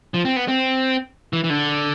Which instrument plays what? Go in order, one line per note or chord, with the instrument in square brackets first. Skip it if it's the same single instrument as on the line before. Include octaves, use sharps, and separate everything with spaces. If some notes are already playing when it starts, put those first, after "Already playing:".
[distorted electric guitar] F3
C4
B3
C4
E3
E3
D3